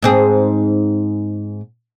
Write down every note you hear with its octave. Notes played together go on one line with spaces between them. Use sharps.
G#2 C4 G#4